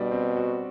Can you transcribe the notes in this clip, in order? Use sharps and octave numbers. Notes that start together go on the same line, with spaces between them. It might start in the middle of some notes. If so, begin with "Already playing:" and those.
Already playing: B2 G3 D4
C4
F#4